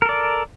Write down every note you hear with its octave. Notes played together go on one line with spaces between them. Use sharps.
A4 A#4 D5